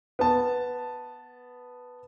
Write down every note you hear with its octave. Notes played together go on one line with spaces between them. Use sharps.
B3 A5